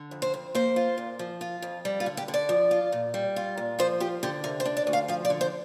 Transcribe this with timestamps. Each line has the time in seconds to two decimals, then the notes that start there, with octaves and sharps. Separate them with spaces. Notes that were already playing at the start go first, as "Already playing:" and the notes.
Already playing: D3
0.11 F2
0.22 C5
0.34 F2
0.55 A#3 C5
0.76 F4
0.98 A#2
1.19 F3
1.41 F4
1.62 F2
1.85 G3
2.00 F4
2.06 D3
2.17 G4
2.28 D3
2.34 D5
2.49 F3
2.71 F4
2.92 A#2
3.14 G3
3.36 F4
3.57 A#2
3.79 F3 C5
4.00 F4 G4
4.23 D3 G4
4.44 C3 A#4
4.60 C5
4.65 D4
4.77 D5
4.87 D2
4.93 F5
5.08 F3 F5
5.25 D5
5.30 D3
5.41 C5